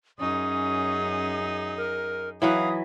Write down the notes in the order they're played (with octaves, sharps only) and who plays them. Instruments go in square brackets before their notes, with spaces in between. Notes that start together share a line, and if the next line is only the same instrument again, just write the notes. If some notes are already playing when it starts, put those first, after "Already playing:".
[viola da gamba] F#2 D#4 G#4 [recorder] C#4 [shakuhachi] D#6
[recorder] A#4
[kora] E3 F#3 B4 [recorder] F5 [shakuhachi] D#6